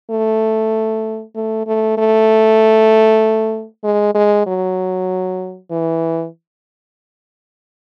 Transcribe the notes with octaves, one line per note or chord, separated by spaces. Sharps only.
A3
A3
A3
A3
G#3
G#3
F#3
E3